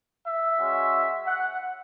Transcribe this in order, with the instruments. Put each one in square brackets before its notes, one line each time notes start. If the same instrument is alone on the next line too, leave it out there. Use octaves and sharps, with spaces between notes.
[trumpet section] E5
G#3 C#4 F#4
F#5